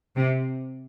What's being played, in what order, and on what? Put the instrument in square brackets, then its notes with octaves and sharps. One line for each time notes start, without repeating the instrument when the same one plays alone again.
[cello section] C3